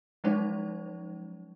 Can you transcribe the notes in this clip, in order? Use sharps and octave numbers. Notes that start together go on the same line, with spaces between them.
F3 F#3 G#3 C#4 D#4 C5